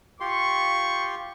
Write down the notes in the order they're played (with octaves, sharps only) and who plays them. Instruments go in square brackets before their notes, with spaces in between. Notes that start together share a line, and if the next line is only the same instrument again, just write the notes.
[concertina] F4 G4 C6 [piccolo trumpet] C#6